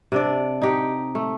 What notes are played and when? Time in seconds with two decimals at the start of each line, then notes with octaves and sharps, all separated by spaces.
0.12 C3 D4 D5
0.62 D#4 G4 F#5
1.15 A3